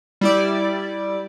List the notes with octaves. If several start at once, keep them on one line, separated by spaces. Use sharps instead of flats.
G3 E4 D5